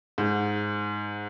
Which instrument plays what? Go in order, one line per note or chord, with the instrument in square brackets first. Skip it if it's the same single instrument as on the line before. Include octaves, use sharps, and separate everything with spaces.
[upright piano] G#2